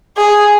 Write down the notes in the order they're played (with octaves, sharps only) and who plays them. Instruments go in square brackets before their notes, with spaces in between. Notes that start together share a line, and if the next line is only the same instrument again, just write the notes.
[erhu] G#4